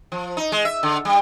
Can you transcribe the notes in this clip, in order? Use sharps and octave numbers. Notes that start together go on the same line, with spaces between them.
F3
D#4
G#3
E5
D3
G3